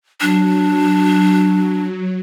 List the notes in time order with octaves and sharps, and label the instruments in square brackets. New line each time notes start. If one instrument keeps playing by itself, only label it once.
[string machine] F#3 [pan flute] D4